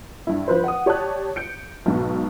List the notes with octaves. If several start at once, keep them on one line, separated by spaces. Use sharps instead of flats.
G2 E4
F3 B4 C5
F#5 D#6
G4 C#5 D5 A5 F#6
G6 C#7 D7
B1 G#2 B2